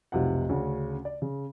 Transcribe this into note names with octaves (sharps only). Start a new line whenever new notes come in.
F1 B1 C3 F4 F#5
D2 C#3 C#4 D4
D5
C#3